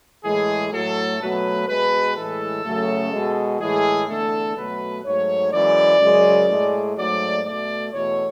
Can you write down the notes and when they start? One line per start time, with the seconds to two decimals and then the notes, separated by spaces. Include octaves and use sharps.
0.24 A2 E3 G#3 G#4
0.72 A2 F#3 A3 A4
1.20 B2 F#3 A3 B4
1.68 B2 G#3 B4
2.16 A2 E3 G#3 A4
2.64 F#2 C#3 F#3 A3
3.12 B2 G#3
3.60 A2 E3 G#3 G#4
4.08 E2 D3 A3 A4
4.56 B2 F#3 A3 B4
5.04 G#2 F#3 A3 C#5
5.52 F#2 E3 G#3 D5
6.00 F#2 C#3 G#3
6.49 A2 G#3
6.97 G#2 F#3 A3 D5
7.44 B2 A3 D5
7.92 E2 B2 A3 C#5